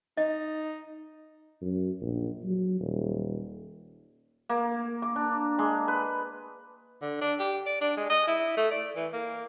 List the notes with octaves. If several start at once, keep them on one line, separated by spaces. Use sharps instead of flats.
D#4 D#5
F#2
A#1
F#3
D#1
A#3
D6
D4
G#3
B4
D3
D4
G4
D5
D4
G#3
D#5
E4
A3
D5
E3
A#3